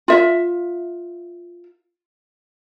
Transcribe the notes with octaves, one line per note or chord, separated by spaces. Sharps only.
F4 E5